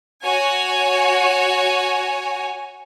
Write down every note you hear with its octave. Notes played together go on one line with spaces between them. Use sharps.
F#4 C#5 G#5